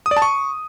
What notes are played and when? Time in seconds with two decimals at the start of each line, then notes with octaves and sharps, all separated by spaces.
0.06 D#6
0.11 D5
0.17 A5
0.22 C#6